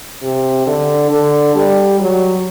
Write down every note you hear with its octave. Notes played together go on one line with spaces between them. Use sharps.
C3
D3
D3
G3
F#3